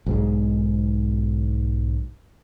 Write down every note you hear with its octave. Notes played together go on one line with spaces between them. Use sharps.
B1 G#2 G#3